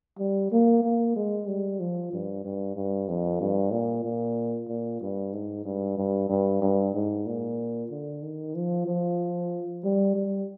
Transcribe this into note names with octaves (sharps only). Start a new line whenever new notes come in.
G3
A#3
A#3
G#3
G3
F3
G2
G2
G2
F2
G2
A#2
A#2
A#2
G2
G#2
G2
G2
G2
G2
G#2
A#2
D3
D#3
F3
F3
G3
G3